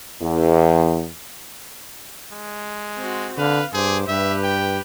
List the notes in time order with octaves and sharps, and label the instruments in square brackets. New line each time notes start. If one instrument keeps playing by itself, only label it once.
[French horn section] E2
[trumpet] G#3
[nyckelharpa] C4 F#4
[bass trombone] D3 [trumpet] B4 [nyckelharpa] F5
[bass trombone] G2 [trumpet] G#4 [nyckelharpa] C5 D6
[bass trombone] G2 [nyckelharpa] G4 B4 [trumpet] E5
[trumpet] G5